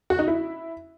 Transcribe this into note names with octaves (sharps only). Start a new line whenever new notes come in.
F#4
D#4
E4